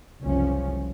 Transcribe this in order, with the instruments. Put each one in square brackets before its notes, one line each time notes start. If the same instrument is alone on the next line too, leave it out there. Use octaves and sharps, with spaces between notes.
[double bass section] F#1 C2 F3 C#4